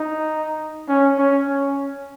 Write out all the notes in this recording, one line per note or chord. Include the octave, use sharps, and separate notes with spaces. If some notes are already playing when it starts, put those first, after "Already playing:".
Already playing: D#4
C#4
C#4
C#4